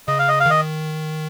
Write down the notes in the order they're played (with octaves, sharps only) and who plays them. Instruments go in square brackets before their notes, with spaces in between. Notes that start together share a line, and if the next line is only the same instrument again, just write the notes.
[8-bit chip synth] C#3 [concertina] D#5
[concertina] F5
D#5
F5
[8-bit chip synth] D#3 [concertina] D#5